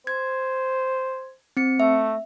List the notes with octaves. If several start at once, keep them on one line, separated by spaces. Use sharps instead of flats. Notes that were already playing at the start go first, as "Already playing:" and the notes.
C5 G#6
C4 C#7
A3 E5